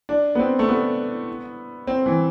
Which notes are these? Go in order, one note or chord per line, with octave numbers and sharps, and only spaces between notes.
D4
B3
C4
A3
B3
C4
E3